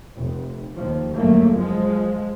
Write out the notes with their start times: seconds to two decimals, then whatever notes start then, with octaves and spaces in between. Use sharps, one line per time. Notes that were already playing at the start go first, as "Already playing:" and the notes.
0.17 F1
0.76 D#2 F3
1.15 G1 F#2 A3 A#3
1.55 F3 G#3